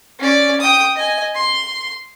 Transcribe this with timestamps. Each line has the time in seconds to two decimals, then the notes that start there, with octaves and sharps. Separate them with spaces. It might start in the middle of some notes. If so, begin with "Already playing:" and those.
0.19 C#4 D5
0.61 G5 D#6
0.96 D#5 G#5
1.35 C6